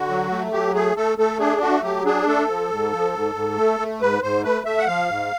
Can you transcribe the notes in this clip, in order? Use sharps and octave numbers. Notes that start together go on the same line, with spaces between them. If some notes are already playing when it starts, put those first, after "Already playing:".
Already playing: D3 F#4
F#3
A3
F#3 G4
A3 G#4
A3 A4
A3 A4
D4 G#4
A3 F#4
F#3 G4
D4 G#4
A3 A4
F3
G#2
F3
G#2
G#2
A3
A3
G#2 B4
G#2 C5
A3 B4
A3 E5
F#5
F3 F5
G#2